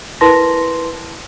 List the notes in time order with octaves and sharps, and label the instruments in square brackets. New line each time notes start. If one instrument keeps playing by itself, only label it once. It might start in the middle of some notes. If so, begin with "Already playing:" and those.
[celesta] E4 A#4 B4 A5 C6 A#6